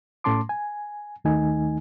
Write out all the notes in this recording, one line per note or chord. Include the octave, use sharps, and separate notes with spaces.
A2 A3 C#4 A5 C6 D6
G#5
D#2 D#3 A3 D#4 G#5